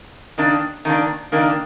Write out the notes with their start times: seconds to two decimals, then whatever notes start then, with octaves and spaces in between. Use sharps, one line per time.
0.38 D#3 A#3 D4
0.85 D#3 A#3 D4
1.32 D#3 A#3 D4